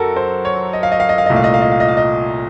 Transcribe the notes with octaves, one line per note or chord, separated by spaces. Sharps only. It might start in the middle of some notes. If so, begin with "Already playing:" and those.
Already playing: F#2 F#4 A4 A#4
C5
C#5
D#5
F5
D#5
F5
D#5
F5
C2 A#2 A3 D#5
F5
D#5
F5
D#5
F5
D#5
F5
D#5